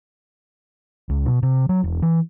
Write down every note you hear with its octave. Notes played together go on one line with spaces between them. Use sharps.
C#2
B2
C3
F#3
E1
E3